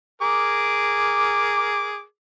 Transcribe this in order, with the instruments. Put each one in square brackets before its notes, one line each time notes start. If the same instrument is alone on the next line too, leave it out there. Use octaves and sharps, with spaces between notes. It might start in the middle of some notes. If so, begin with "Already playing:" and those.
[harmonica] G#4 A#4 D6